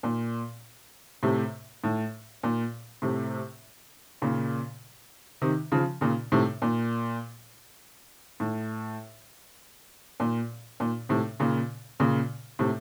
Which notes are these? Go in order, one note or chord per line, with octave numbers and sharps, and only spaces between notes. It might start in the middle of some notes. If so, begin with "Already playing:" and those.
A#2
A2 C3
A2
A#2
A2 C3
A#2 C#3
C3 D#3
C#3 F3
A#2 C#3
A2 C3
A#2
A2
A#2
A#2
A2 C3
A#2 C#3
A#2 C#3
A2 C3